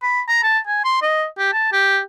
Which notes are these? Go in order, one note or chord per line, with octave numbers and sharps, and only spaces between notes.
B5
A#5
A5
G#5
C6
D#5
G4
A5
G4